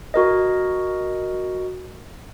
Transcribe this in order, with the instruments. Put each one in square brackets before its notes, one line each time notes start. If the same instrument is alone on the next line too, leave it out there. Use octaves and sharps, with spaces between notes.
[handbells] F#4 A#4 D#5